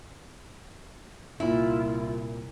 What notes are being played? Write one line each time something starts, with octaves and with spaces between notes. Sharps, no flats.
C2 A#2 E4 F4